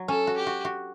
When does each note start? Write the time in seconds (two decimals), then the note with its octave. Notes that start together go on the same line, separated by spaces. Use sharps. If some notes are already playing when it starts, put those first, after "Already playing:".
Already playing: F#3
0.08 C#4 A4
0.27 F#4
0.37 G4
0.47 F#4
0.65 F#4